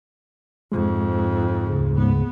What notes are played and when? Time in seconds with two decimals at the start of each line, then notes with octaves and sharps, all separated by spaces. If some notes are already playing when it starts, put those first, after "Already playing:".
0.72 F2 G#2 G#3
1.65 D2 C#3
1.98 G#2 B3